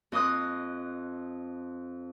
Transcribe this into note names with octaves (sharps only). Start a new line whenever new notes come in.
F2 D#5 C6 D#6 F#6